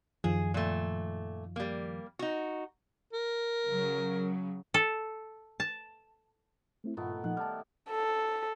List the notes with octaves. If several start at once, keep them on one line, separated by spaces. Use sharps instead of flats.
F#2 D#3 F3 G#4
A#2 A3
G3 A#3
D#4 F#4
A#4
C#3 F#3
A4
A5
A3 C4 E4
G2 A#2 D#3 A3 B3 F4
A#2 F3 D#4 F#5
G3 E4 A5 F6
A4